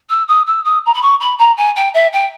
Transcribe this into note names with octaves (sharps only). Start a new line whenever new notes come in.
E6
D#6
E6
D#6
A#5
B5
C#6
B5
A#5
G#5
G5
E5
G5